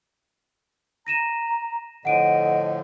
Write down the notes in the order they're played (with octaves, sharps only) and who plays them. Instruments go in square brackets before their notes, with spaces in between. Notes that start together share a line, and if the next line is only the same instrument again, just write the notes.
[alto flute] A#5 [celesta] A#6 D#7 E7
[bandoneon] A2 D3 F3 [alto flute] D#5 [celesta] F#5 D7 D#7